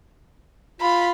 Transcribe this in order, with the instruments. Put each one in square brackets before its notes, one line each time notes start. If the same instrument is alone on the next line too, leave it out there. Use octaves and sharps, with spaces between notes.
[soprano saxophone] F4 [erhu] B5